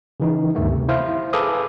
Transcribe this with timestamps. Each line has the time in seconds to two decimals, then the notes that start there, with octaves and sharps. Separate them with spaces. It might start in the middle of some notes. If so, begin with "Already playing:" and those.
0.20 C#3 E3 D#4
0.55 D2 G2 D#3 A3 B3
0.70 C3
0.88 E4 C5 E5 F5
1.33 G#4 A4 B4 F5 D6 D#6